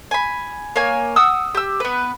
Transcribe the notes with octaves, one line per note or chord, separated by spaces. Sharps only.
G#5 B5
A#3 C#5 G#5
F#5 D#6 E6
G4 E6
B3 B4